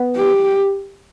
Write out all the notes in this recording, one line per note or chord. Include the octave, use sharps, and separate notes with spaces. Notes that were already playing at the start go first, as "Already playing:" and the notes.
Already playing: B3
G4